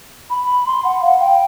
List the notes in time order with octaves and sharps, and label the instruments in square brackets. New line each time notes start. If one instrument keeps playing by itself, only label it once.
[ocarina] B5
C6
F#5
F5
G5